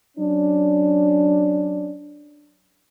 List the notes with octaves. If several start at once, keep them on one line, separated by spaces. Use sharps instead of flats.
F#3 C#4 D4